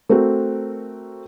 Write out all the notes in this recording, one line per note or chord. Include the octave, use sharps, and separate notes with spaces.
A3 C4 F#4 A#4